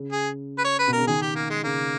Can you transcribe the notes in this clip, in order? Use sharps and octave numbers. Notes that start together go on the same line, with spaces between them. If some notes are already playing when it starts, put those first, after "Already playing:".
Already playing: C#3
G#4
B4
C#5
B4
B2
A#4
C#3
D#3 G#4
G4
A#3
G#3
C#3 A#3